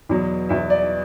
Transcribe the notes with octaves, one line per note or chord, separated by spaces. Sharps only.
E2 B2 F#3
E2 B2 F#3 E5
D5